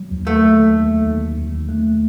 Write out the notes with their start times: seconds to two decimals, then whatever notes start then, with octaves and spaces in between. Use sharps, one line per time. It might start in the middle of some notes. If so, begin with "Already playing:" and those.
Already playing: F#3
0.11 D#2
0.27 A3
0.43 D#2
0.74 D#2
1.06 D#2
1.37 D#2
1.69 A3